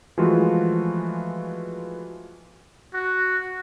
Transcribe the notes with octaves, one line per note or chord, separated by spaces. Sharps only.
E3 F3 G#3 A3 F4 F#4
F#4